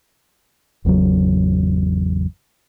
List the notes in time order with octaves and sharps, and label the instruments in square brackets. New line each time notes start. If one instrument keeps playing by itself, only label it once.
[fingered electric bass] G#1 E2 C#3 F#3